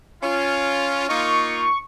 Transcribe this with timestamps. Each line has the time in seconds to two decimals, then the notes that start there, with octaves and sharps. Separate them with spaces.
0.23 C#4 F4
1.09 A#3 D#4 F4 C#6